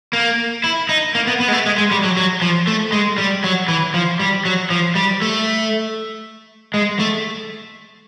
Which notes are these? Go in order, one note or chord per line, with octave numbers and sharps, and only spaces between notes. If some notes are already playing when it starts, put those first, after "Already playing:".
A#3
E4
D#4
A#3
B3
B3
G#3
A3
G#3
G#3
G3
F#3
F#3
F3
A3
G#3
G3
F#3
E3
F3
G3
F#3
F3
G3
A3
G#3
A3